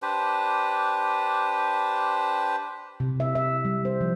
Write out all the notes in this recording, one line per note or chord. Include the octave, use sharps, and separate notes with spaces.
D4 G4 B4 C5
C3
E5
E5
G3
C5
F3